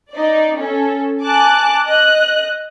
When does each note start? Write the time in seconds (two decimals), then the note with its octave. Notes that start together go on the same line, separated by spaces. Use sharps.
0.12 D#4 D5
0.57 C#4 A4
1.20 G#5 A5 D6 F#6
1.83 D#5 F#6